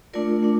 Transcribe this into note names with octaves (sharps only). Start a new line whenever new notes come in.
A3 D4 F4 A#4 D5
A3 D4